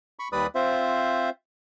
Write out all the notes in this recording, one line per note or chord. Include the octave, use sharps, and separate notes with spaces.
B5 C#6
D#2 G3 B4 D5 B5 D#6
C4 F4 C5 E5